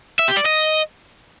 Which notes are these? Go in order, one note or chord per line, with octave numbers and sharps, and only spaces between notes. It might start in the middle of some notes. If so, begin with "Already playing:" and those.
E5
G4
D5
D#5